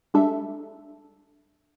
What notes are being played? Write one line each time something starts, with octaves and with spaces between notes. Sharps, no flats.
G3 G#3 D4 A4 E5